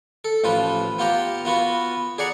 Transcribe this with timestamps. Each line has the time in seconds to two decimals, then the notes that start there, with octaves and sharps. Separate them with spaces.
0.25 A4
0.44 A1 F3 F4 B4
0.99 B3 F4 G4 A#5
1.45 B3 F4 F#4 B4
2.18 G#4 D5 F#5 A#5